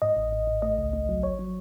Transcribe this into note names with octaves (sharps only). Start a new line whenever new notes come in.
G#2 D#5
A1
A1
A1
A3 D#5
C#2
A3
F#3
G#1 C#5
F#3